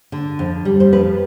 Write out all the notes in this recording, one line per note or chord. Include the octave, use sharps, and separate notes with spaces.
D3
F2
G3
C5
F2 B4